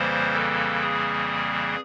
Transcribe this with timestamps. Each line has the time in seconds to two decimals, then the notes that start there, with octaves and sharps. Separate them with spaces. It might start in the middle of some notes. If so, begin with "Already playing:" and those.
Already playing: F2 C#3 E3 G3 A#3 C5
0.34 A4
0.81 G#4